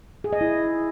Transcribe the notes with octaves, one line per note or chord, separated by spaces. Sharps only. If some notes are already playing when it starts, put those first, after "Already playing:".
G#4
D#5
E4